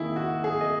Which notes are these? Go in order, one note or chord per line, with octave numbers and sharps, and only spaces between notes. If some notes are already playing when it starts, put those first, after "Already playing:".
Already playing: D#3 A#3 E4 G#4
F#4
G#4
D#5